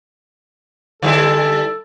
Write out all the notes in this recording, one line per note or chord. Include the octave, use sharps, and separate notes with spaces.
D3 G3 E4 A4